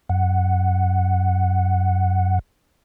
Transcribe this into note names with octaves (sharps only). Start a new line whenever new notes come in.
F#2 F#5